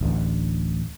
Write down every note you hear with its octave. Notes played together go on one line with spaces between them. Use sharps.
D1 A1 D2